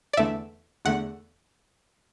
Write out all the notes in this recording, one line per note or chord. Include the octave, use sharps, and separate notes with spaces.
D5
E2 D3 A3 E5
E2 D3 A3 F#5